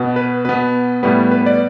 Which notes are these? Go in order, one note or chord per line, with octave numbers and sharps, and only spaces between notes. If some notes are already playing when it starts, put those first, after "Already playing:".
Already playing: B2 B3
B4
B2 B3 B4
A2 G3 B3 B4
B4
D5